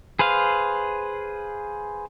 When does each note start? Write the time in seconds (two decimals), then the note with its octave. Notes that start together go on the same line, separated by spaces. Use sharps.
0.19 G#4 B4 C5 F5